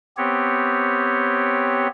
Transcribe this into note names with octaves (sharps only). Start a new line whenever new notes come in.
B3 C4 G4 C#5